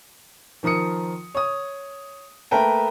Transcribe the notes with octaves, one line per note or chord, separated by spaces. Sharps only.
D#3 F3 A#4 D#6 C#7
C#5 D#6
A3 A#3 A#4 B4 G5 A5